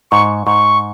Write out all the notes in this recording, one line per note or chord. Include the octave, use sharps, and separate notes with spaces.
G#2 C#6
G#2 C#6